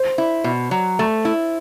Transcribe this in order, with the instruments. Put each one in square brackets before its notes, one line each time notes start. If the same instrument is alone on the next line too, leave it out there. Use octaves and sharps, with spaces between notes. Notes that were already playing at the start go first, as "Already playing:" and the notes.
Already playing: [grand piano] C5
[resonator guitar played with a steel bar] E4
B2
F#3
A3
E4